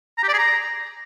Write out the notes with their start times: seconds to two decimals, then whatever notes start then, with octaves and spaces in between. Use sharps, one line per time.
0.18 A#5
0.23 G4
0.29 D5
0.34 G#4
0.39 A#5